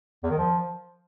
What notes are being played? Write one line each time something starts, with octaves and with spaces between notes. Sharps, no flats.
E2
D#3
F3